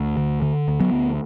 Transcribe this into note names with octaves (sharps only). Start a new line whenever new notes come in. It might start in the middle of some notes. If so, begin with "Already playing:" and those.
Already playing: D2
D3
D3
D2
F#3 B3
D2